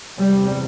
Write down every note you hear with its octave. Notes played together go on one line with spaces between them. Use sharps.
E2 C3 G3